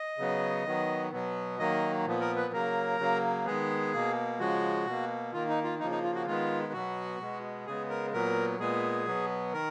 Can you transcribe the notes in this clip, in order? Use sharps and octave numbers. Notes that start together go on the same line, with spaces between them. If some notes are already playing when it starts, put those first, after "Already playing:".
Already playing: D#5
C#3 F#3 B3
D#3 F#3 B3
B2 F#3 B3
D#3 F#3 A#3 D#5
A#2 F3 B3
A#4
B4
C#3 F#3 A#3 A#4
C#3 F#3 A#3
D#3 G#3 B3 G#4
B2 A#3
C#3 F3 G#3 F#4
B2 A#3
D#3 A#3 F4
D#4
F4
C#3 F3 A#3 D#4
D#4
F4
F#4
D#3 G#3 B3 F4
B2 F#3 B3 F#4
B2 G#3 B3
C#3 G#3 B3 G#4
A#4
A#2 F#3 B3 A#4
A#2 G#3 B3 G#4
B2 F#3 B3
D#3 A#4